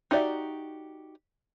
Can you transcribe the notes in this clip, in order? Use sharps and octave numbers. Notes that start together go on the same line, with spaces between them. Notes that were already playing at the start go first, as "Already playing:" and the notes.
D#4 F#4 G4 D5 E5